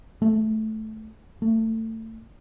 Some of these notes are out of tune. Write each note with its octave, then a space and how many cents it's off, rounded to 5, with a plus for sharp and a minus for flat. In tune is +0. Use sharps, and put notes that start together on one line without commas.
A3 -10
A3 +25